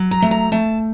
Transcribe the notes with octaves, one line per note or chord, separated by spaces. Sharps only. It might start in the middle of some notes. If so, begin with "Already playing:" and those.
Already playing: F#3
A#5
A3
A#5
A3 A5